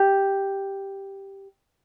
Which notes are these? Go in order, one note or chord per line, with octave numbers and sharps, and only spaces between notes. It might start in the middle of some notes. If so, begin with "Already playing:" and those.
Already playing: G4